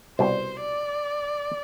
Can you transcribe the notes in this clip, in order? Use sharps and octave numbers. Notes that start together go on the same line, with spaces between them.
C2 B2 G3 C5
D5